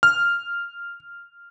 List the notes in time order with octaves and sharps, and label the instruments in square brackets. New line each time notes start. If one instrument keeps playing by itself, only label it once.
[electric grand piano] F6